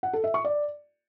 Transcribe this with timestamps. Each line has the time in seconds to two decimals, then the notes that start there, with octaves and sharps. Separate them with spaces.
0.03 F#5
0.13 A4
0.24 E5
0.34 C#6
0.45 D5